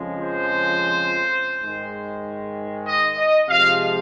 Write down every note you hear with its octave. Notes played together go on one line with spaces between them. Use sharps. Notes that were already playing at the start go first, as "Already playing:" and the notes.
Already playing: F2 C#3 F3 G#3
C5
G#2 D#3 G#3
D#5
D#5
C3 F3 G#3 F5